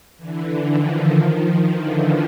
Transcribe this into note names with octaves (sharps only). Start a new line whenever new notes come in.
D3 E3
D#3 F3
D3 E3